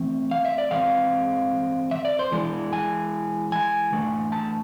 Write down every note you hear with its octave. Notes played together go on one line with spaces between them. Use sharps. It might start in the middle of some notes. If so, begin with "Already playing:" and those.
Already playing: E3 A3 C4
F5
E5
D5
E3 G#3 C4 F5
E5
D5
C5
E3 G#3 D4
G#5
G#5
E3 A3 D4
A5